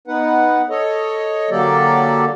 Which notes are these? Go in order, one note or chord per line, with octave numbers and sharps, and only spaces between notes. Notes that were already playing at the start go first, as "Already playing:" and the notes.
B3 D#4 B4 F#5
A4 C#5 D#5
D3 F#3 A#3 G4 A4 D5